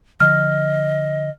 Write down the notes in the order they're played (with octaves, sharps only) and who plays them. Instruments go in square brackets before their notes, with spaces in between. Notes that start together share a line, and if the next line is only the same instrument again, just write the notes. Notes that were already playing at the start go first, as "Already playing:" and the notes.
[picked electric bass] D3 F3 [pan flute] D#5 [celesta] F6